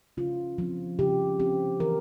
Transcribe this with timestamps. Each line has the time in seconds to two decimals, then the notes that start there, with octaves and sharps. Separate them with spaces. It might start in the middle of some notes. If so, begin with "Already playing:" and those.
0.17 C#3 F4
0.58 F3 C4
0.99 C#3 G4
1.39 F3 C4 G4
1.80 E3 A#4